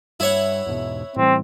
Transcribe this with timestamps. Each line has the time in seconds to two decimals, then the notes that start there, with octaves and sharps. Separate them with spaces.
0.20 G2 E4 C#5 F#5
0.66 E2 G#2 B2
1.16 A2 E3 G3 C4